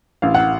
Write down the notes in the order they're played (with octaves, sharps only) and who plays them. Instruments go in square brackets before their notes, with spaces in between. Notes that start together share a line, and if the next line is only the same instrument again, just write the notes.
[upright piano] A1 F5
F#5